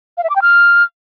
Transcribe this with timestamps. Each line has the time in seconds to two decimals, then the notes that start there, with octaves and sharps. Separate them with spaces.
0.18 F5
0.24 E5
0.30 D6
0.36 G5
0.42 F6